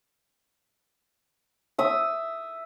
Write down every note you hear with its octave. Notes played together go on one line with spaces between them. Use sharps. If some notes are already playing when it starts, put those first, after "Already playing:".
E5 D#6 E6